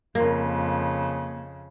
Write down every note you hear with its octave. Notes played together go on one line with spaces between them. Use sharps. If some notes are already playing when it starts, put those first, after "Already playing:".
F2 C#3 A#3